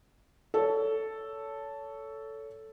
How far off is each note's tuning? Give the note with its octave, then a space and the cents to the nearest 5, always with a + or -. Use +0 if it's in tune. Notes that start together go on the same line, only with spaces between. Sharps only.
A4 +0 C#5 +25